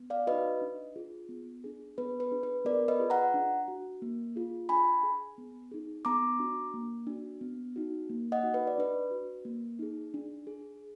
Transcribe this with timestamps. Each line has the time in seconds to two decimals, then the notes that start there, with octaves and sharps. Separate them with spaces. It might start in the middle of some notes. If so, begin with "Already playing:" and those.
Already playing: B3
0.10 D5 F5
0.27 F#4 B4 D#5
0.31 D#4
0.61 D4
0.96 F4 G#4
1.29 B3
1.64 D4 G#4
1.98 B3 B4
2.20 B4
2.31 D4 G#4
2.43 B4
2.65 B3 A#4 D5
2.88 B4 D#5
3.00 F4 G#4
3.10 F#5 A#5
3.34 D4
3.68 F#4
4.02 A#3
4.36 F4 G#4
4.69 D4 G#5 B5
5.03 G#4
5.38 B3
5.71 D#4 G#4
6.05 B3 A#5 D6
6.39 D4 F#4
6.74 A#3
7.07 D4 F#4
7.41 B3
7.76 D#4 F#4
8.09 A#3
8.32 D#5 F#5
8.43 D#4 F#4
8.54 B4
8.67 D5
8.78 D4 B4
9.11 F#4
9.45 A#3
9.79 D#4 G#4
10.14 D4
10.47 G#4